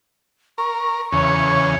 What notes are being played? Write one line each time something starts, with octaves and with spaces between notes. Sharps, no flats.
A#4 C#6
E2 C#3 C#5